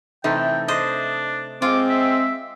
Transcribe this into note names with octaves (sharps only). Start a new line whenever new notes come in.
C3 E3 A3 D#4 G5
D4 C5 D#5
G#3 C4 F4 D6
E5